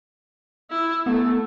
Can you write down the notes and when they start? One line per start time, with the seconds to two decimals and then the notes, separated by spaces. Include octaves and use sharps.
0.71 E4
1.06 A3 B3 A4